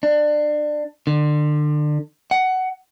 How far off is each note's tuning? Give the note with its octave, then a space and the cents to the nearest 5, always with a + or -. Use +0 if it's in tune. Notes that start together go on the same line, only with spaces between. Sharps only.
D4 +25
D3 +30
F#5 +15